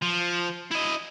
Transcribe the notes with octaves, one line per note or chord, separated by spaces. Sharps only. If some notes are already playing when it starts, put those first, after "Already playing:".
F3
E4 D#5